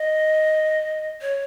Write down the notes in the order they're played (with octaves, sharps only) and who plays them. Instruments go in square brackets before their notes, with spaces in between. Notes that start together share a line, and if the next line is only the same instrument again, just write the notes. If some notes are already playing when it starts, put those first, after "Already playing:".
Already playing: [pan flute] D#5
C#5